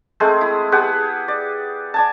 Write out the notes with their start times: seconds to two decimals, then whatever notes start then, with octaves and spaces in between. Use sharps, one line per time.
0.20 G#3 A3 C4 G#4
0.41 E4
0.72 B3 G4 G#4 F#5
1.28 D5
1.94 D5 G#5 A5